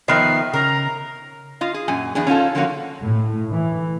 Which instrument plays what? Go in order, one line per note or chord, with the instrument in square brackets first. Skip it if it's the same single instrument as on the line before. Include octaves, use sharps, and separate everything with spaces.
[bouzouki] D#3 F3 E5 [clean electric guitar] B3 A#4 B4 [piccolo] C7
[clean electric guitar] C#3 [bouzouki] A#4 [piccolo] A#5
[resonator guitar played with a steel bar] F4 D#5
G#4
F#2 A#2 G#5
E2 D4 G#4
C#4 D#4 F4 A4
D3 F3 A#3 C#4 F#4 C#5
[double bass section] A2
E3